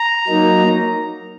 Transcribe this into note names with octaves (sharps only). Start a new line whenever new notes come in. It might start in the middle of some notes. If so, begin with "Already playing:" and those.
Already playing: A#5
F#3 A#3 D#4